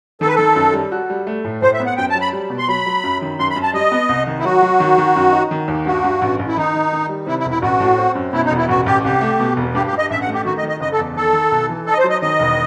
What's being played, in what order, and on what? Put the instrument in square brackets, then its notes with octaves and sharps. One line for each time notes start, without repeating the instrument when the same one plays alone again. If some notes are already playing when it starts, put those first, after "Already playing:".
[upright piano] D#3 [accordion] A4
[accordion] B4
[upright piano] D#3 [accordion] A4
[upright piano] F#2
G3
F#4
G3
A3
A2
[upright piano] A2 [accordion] C5
[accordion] E5
[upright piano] B3
[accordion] F#5
[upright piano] F#2 [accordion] G5
[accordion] A5
[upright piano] F#3
[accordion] B5
[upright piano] G3
B2
[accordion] C6
[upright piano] F#3 [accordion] B5
[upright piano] F#3
F#2
D#3
[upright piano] F#2 [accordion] C6
[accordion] B5
[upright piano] F#2
[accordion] A5
[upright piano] G3 [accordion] D#5
[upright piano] B3
C2
D#3
[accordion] E4
[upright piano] F#3 [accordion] F#4
[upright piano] F#3
D#3
D#3
F#2
D#4
D#3
D#2
[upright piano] G2 [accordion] F#4
[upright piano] G2
A1
A1
[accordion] E4
[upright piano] D#3 [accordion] D#4
[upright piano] D#3
D#3
G3
[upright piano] C3 [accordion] E4
[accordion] E4
[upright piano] E1
[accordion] E4
[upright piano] A1 [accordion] F#4
[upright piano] A2
C4
F#2
[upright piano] B2 [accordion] E4
[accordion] D#4
[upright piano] E1
[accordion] E4
[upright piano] A1 [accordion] F#4
[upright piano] A1 [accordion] G4
[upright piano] C2 [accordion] G4
[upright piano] A3
B2
E1
[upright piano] G2 [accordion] G4
[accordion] G4
[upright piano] G2
[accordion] D#5
[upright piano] A1 [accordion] E5
[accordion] F#5
[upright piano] A3
[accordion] G4
[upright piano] D#3 [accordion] F#4
[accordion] D#5
[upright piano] D#3
[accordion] D#5
[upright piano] F#1 [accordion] D#5
[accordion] A4
[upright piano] E2
[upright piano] D#3 [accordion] A4
[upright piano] D#3
B1
E3
[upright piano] D#4 [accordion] A4
[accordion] D#5
C5
[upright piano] F#3
[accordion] D#5
[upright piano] D#3 [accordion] D#5
[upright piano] E1